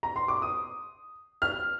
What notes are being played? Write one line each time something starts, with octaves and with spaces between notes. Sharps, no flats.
A#5
C6
D6
D#6
F6